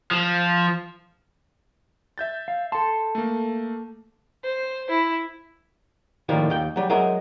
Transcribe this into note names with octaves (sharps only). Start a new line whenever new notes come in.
F3
E5 G6 A6
F5
A4 A5 C6
A3 A#3
C5
E4
A2 D#3 F3 G3 A#3
D#2 G5
F#3 G3
F#3 G#3 A#4 D#5 E5